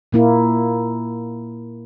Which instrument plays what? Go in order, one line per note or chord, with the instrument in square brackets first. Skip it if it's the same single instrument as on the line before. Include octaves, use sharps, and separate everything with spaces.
[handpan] A#2 A#3 E4